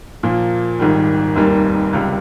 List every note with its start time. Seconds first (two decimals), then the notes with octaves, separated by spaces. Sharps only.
0.23 A#2 F3 A#3
0.79 G#1 G#2 D#3 G3
1.36 F1 D#2 D#3 G3 A#3
1.93 C#2 C3 G3